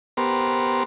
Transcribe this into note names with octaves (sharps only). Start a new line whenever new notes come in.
B3 G4 A#4 C5